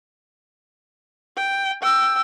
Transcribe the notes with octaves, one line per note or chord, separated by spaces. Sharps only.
G5
G5 E6